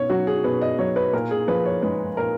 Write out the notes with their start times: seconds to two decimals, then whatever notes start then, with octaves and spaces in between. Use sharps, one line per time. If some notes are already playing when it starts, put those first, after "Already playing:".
Already playing: B2 C#5
0.10 F#3 F#4
0.27 G#4
0.44 B2 B4
0.62 D#5
0.79 F#3 C#5
0.96 B4
1.13 A#2 A#4
1.31 G#4
1.48 F3 B4
1.65 C#5
1.83 G#3 B4
2.17 A#2 A#4